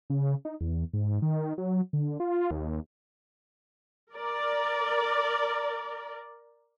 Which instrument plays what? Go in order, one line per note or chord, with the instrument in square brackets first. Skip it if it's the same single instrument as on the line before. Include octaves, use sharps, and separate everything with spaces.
[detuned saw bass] C#3
D#4
E2
G#2
D#3
F#3
D3
F4
D#2
[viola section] A#4 D5